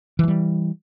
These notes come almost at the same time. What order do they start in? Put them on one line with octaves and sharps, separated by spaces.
E3 F3 G3